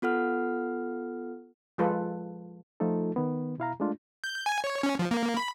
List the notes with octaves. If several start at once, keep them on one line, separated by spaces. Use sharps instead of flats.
B3 F4 A4 F#5 F6
F3 G#3 F4 A4 B4
F3 A3 D#4 F4 A4
D#3 B3
B2 E4 F5 A#5
G#3 A3 D4 F4
G6
G#5
C#5
C#4
F3
A#3
B5